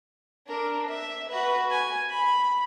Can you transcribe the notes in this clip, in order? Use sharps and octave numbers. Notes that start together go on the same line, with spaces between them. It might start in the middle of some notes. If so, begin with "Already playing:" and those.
D4 A#4
E5
F#4 B4
G#5
B5